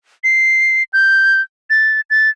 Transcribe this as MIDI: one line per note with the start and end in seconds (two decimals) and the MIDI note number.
0.24 0.83 96
0.93 1.41 91
1.70 2.01 93
2.10 2.30 93